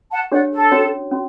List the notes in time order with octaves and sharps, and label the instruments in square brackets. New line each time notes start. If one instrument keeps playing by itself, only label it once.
[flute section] F#5 A5
[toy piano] D4 G4 C#5 [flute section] D5 F#5
[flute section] A4
[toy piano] C#4 F#4 C#5
C#4 F#4